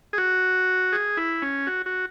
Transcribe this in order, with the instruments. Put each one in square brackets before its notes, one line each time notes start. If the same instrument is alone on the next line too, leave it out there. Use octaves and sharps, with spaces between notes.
[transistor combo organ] G#4
F#4
G#4
E4
C#4
F#4
F#4